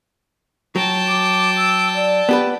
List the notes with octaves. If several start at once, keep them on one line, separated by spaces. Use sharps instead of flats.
F#3 G5 A5
D6
E6
D5
B3 G4 B4